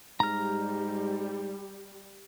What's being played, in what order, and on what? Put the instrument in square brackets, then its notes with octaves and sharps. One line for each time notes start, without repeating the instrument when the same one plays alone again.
[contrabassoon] G#2 [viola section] G3 [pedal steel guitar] A#5 F6